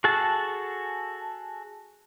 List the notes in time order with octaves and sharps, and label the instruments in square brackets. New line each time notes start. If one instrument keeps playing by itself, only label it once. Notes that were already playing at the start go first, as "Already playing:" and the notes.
[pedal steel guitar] F#4 G#4 A4 A5